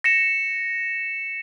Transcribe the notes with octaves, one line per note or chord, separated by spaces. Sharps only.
A#6 C#7 E7